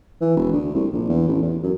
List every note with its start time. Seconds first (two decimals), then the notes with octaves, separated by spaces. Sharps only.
0.22 E3
0.37 E1
0.53 D2
0.75 C2
0.93 A#1
1.09 E2
1.28 A1
1.42 E2
1.63 F#2